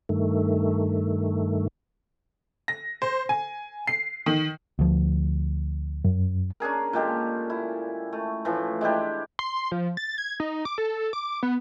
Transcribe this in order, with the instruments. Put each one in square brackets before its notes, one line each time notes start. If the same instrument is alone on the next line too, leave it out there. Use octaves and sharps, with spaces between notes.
[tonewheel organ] G2 D#3 A3
[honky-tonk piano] A#6
C5
G#5
C7
D#3
[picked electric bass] D2 F3
[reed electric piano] F#2
[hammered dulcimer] C#4 D4 G#4 A#4
A#2 G#3 G4 A4
E4
A3
A2 E3 F3
G#3 D4 E4 G4
[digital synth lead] C6
F3
A6
G#6
D#4
D6
A4
D6
B3